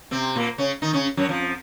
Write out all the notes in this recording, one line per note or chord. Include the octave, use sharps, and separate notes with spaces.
C3 C4
A#2 A#3
C#3 C#4
D#3 D#4
C#3 C#4
F#2 F#3
F2 F3